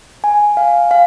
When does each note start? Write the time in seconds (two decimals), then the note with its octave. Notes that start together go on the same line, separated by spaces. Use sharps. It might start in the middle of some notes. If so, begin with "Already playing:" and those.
0.24 G#5
0.57 F5
0.91 F5